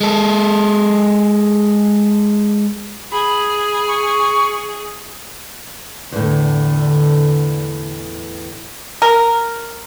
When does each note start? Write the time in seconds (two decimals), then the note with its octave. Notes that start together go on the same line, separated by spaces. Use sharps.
0.01 G#3 A4
3.12 G#4 B5
3.88 C#6
6.12 E2 A2 D3
9.02 A#4